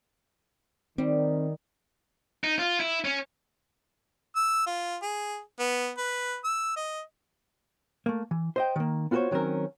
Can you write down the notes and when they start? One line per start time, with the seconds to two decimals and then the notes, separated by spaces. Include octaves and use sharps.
0.98 D#3 G3 C4
2.44 D#4
2.59 F4
2.80 E4
3.05 C#4
4.36 E6
4.66 F4
5.02 G#4
5.60 B3
5.98 B4
6.44 E6
6.77 D#5
8.06 A3 A#3
8.31 E3
8.56 C5 D#5 G5
8.76 D#3 A#3
9.11 B3 F4 F#4 A4 C5 C#5
9.31 D#3 F#3 C4 C#4 A#4